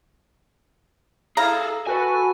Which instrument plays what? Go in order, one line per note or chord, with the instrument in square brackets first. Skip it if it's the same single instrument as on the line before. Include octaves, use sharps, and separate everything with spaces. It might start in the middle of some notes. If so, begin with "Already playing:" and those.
[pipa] E4 F5 A#5 [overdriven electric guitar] G#4 A4
[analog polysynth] F#4 A4 B4 [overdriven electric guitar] G#5